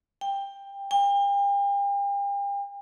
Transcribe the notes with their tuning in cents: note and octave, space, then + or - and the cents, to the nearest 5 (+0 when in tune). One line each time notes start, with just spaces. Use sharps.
G5 +15
G5 +40